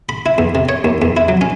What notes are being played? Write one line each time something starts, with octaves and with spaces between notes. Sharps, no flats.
B5
E4
E2
C3
C#5
D#2
E2
E4
F#3
C#4